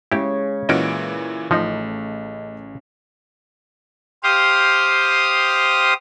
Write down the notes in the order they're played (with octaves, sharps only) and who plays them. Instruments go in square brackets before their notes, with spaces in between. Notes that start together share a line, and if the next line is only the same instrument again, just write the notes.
[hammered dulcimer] C#3 [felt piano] G#3 [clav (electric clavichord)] E4 G4
[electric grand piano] A#2 E3 D7 [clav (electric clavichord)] C#4 F#4 D#5
[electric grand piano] A1 [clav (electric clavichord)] F3 D#4 [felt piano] A3 D#5
[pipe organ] G4 C5 F5 D#6